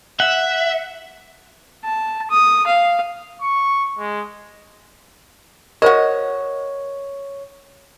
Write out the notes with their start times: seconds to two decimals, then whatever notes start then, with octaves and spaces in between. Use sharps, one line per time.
0.20 E5 F#5
1.84 A5
2.30 D#6
2.67 F5
3.41 C#6
3.99 G#3
5.82 F#4 A#4 C5 C#5 D#5 F5